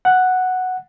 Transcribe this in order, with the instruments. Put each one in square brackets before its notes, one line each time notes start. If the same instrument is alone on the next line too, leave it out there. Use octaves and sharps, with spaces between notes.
[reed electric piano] F#5